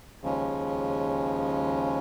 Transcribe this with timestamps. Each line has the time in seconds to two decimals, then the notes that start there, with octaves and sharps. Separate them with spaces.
0.22 D#2 C#3 F3 G#3 C#4